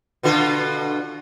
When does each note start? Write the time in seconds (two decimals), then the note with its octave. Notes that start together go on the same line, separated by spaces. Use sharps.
0.23 B2 D3 F4